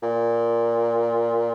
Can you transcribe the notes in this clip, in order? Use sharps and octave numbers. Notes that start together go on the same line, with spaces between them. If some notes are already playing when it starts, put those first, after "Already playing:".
A#2